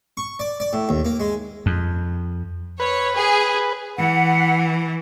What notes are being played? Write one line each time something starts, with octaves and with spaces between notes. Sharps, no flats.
C#6
D5
D5
A2
D#2
A#3
G#3
F2
B4 C#5
G#4
E3 F#5